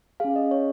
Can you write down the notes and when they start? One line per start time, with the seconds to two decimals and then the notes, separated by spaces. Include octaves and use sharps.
0.20 C#4 G#4 F5
0.36 D#5
0.51 C#5